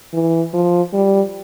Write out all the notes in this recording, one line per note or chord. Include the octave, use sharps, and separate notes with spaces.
E3
F3
G3